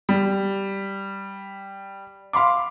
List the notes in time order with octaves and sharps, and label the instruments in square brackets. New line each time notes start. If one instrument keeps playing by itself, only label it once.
[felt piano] G3
F5 B5 C6 D6